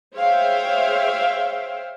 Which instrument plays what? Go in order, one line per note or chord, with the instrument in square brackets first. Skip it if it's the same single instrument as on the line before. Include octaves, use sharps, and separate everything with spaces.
[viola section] G#4 C5 C#5 E5 F5 G5